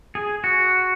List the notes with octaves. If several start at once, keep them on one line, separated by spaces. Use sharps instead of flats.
G#4
F#4